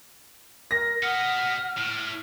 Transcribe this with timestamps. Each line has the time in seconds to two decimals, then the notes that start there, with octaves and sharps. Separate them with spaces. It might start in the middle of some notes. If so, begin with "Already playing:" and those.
0.71 A#4 A#6
1.03 B3 D#5 F#5 F6
1.77 A2